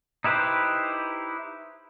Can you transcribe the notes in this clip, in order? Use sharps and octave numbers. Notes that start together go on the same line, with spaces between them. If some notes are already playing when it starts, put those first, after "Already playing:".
D#4 E4 G4 B4 C5